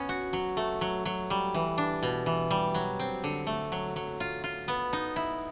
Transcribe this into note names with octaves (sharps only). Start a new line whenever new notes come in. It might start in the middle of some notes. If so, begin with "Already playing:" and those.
Already playing: B3 C#4
F#4
F#3
A3
F#3
F#3
G3
E3
D4
B2
E3
G3
F#3
C4
D3
A3
F#3
F#3
F4
F4
B3
D#4
E4